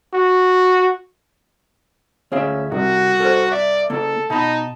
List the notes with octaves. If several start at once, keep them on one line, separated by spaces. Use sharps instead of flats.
F#4
D2 C#4 G#4 E5 F5
C2 C3 F#4
A4 A#4 C5
D5 E5
C#3 A#3 A4
B2 D#4 A5 B5